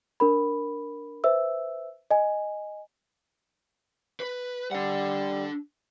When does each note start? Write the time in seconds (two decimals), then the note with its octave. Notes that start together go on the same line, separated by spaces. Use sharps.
0.20 D4 A#4 B5
1.24 B4 C5 E5 E6
2.11 D#5 G#5
4.20 B4
4.71 G3 D4 F#5